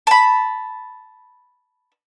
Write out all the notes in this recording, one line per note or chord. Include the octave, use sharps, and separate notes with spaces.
A5 B5